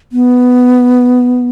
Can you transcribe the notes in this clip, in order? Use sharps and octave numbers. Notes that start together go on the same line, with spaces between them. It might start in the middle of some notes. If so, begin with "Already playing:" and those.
B3